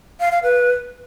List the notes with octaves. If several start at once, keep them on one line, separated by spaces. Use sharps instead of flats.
F5
F5
B4